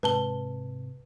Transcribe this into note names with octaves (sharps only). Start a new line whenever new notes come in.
G#2 C3 B4 A5 G7